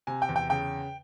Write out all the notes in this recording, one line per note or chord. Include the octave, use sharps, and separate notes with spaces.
C3 G#5
G5
E2
G5
C#3 G5